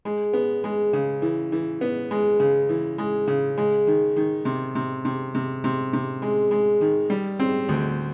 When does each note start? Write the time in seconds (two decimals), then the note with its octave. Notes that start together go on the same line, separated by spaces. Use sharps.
0.05 G#3
0.33 B3
0.64 G#3
0.93 C#3
1.22 E3
1.52 E3
1.81 B3
2.11 G#3
2.40 C#3
2.69 E3
2.98 G#3
3.28 C#3
3.58 G#3
3.87 D#3
4.16 D#3
4.45 C3
4.75 C3
5.05 C3
5.35 C3
5.64 C3
5.93 C3
6.22 G#3
6.51 G#3
6.81 D#3
7.10 G3
7.40 C4
7.69 D2